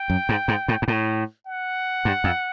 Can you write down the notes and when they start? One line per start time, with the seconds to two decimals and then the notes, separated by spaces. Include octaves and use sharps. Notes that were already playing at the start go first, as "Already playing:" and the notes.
Already playing: G5
0.10 F#2
0.29 G#2
0.48 G#2
0.68 A2
0.82 G#2
0.88 A2
1.46 F#5
2.05 G2
2.24 F2